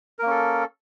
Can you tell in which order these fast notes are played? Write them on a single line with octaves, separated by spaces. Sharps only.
A#4 A#3 C#4 A4